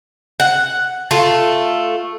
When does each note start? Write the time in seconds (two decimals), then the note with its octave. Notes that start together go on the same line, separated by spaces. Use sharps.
0.40 F#5
1.11 A3 F4